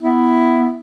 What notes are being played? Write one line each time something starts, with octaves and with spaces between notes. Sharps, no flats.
B3 E4